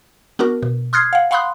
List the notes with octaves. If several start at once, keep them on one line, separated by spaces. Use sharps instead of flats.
B3 D4 F#4 A#4
B2
C6 D#6 F6 F#6 G#6 C7
F5 F#5
F5 F#5 B5 C6 D#6 F#6